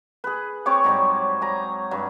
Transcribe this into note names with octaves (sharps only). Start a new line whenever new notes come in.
G#4 B4
C4 C#5 C#6 D6
G#2 F#3 G3
G#5 A#5
G2 F#3